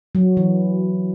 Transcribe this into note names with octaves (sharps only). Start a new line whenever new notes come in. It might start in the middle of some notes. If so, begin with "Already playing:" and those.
F#3
E3